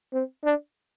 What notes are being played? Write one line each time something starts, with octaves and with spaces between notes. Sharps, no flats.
C4
D4